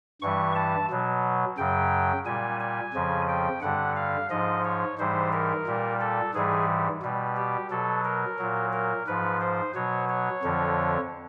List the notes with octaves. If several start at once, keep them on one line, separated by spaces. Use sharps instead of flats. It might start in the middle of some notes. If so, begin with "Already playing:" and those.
G2 E3 G3 C#6
A5
B2 F#3
F#2 C#3 F#3 G5
A#2 G3 G#5
G#5
F2 C#3 F3
G5
G2 D3 G3 F#5
F5
G#2 F3 D#5
C#5
G#2 E3 G3 C5
A#4
A#2 G3
A4
G#2 E3 G3 G#4
B2 G3
G4
B2 F#3 A4
A#4
A#2 F#3
A#4
G#2 F3 B4
C5
B2 F#3 C#5
C#5
F2 D3 F3